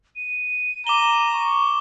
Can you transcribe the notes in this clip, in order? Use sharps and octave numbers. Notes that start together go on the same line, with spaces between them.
D#7
A#5 D6 E7 G7
C#6